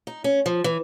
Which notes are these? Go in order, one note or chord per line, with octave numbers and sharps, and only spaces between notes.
D#4
C#4
F3
E3